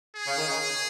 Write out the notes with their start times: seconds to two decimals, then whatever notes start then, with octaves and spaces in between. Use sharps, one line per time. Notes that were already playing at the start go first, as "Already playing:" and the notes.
0.16 G#4
0.27 C#3
0.37 D#3
0.48 C#3